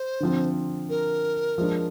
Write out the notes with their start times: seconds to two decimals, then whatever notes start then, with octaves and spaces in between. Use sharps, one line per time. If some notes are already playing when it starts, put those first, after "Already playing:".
Already playing: C5
0.20 D3 F3 C4
0.89 A#4
1.58 F3 G#3 D4